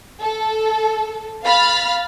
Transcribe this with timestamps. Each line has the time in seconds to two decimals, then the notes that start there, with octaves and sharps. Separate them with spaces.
0.20 A4
1.43 F5 B5 F6 A6